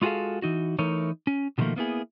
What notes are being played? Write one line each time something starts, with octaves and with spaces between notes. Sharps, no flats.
G#3 F4 F#4 G#4 A4 F5
E3 D#4 F#4
E3 A3 D#4 A#4 C#5
C#4
B2 D3 D#3 F3 A3 A#3
A#3 B3 E4 G#4